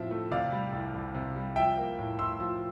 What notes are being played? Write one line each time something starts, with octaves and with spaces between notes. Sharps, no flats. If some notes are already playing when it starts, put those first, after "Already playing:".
Already playing: A2 F3 C4 E5
A3
C3 D5 F5
G3
C2
C2
C3
G3
F3 E5 G5
A#3
A2
A2 C6 E6
F3